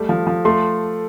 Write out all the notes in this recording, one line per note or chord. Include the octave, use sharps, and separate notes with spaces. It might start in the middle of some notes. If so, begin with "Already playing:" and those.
Already playing: G3 A3
F3
F3
A3 C6